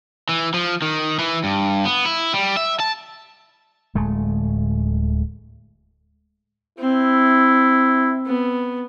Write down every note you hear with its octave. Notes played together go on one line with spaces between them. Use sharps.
E3
F3
D#3
E3
G2
B3
E4
G3
E5
A5
D1 G#3 A3
C4 E4
B3